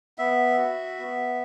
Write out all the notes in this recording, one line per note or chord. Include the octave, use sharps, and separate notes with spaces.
B3 E5
F#4
B3